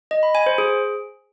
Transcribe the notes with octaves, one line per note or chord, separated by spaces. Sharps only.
D#5
B5
G#5
C5
G#4